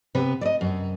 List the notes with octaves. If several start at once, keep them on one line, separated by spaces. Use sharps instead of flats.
C3 B3 B4
D5 D#5
F#2